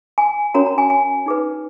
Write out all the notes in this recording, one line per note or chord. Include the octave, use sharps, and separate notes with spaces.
G#5
C#4 F#4 A#4 C#5 A#5
A#5
G#5
G#5
D#4 G#4 B4